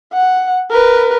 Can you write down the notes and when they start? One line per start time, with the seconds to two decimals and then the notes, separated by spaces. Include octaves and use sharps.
0.13 F#5
0.71 A#4 B4